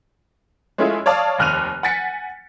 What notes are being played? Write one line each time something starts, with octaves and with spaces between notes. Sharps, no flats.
G#3 A3 C#4 E4 F4 G#4
C#5 D5 F5 A5 D#6
F1 D#2 F6 F#6 D#7 F7
F#5 G#5 A6 B6 C#7